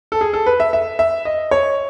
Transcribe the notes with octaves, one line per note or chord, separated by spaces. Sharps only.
A4
G#4
A4
B4
E5
E5
E5
D#5
C#5